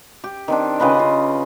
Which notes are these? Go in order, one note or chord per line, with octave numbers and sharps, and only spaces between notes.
G4
D#3 C4 D4
C#3 F4 B4 D#5
F4